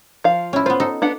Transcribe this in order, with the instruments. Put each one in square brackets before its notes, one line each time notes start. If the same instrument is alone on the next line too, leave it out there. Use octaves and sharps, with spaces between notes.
[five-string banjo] F3 F5
[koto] C#4 E4
[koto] B3 F4 [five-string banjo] C5
[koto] D#4 A4
[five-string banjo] B3 D4 F#5